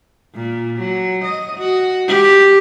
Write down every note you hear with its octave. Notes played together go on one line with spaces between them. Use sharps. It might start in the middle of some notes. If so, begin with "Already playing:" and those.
A#2
F#3
D#5
F#4
G4